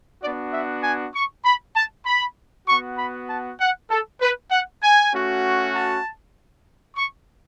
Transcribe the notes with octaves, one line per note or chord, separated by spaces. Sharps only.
B3 D4 F#4 D5
E5
G#5
C#6
B5
A5
B5
B3 F#4 C#6
B5
A5
F#5
A4
B4
F#5
G#5
A3 C#4 F#4
A5
C#6